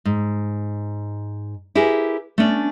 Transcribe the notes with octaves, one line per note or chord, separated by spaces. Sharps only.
G#2
E4 G4 G#4 A#4 B4
A3 B3 C#4 D4